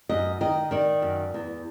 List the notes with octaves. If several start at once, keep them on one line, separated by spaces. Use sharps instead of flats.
F#2 D#5
D#3 D#5
D#3 D5
F#2
E2